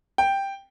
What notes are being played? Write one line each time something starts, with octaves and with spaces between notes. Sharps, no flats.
G5